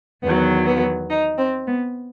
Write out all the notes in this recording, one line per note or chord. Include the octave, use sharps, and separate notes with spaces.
E2 D#3 F#3 B3
B3
D#4
C4
B3